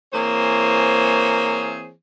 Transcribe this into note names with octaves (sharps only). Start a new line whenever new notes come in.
E3 A#3 C4 G#4 C5 C#5